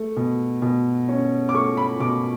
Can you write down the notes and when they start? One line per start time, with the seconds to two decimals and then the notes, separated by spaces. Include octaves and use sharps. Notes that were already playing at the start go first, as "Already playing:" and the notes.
Already playing: A3
0.17 B2
0.62 B2
1.09 C#4
1.49 D6
1.54 A3 C#6
1.77 B5
2.00 B2 D6